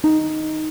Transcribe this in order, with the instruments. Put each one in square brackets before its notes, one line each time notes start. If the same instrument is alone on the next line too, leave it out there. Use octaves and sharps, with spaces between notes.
[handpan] D#4